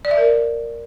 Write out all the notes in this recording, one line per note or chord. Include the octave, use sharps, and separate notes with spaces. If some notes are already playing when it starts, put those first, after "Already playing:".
D5
E5
A#4